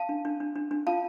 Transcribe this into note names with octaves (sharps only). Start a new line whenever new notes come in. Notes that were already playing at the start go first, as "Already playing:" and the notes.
Already playing: F5 A5
D4
D4
D4
D4
D4
F4 F5 A5